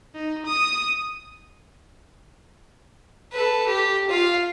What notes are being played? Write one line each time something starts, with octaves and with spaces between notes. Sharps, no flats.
D#4
D#6
A4 B4
G4
F4 F5